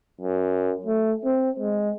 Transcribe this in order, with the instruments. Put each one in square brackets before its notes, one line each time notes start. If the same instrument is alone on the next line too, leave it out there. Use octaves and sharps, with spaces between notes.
[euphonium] F#2
A3
C4
G#3